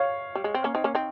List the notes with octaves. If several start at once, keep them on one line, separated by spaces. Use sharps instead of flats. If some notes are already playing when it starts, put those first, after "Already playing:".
Already playing: C#5 F5
G3
G#3
C4
A#3 C#4
C4 D#4
A#3 C#4
C4 D#4